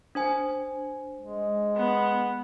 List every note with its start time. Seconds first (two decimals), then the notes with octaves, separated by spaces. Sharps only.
0.15 D4 C5 G#5
1.20 G#3
1.76 B3